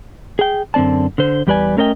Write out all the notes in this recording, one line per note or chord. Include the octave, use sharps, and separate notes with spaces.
G#4 G5
F#2 D3 C4 D5 A5
D3 C5
E2 G3 G4 B4 D5 G#5
A3 C#4 A#4 C#5 D#5 G5